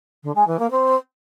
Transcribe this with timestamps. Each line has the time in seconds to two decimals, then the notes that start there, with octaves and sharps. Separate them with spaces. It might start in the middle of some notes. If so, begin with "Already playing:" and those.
0.23 D3
0.35 G#3
0.47 E3
0.59 A#3
0.71 C4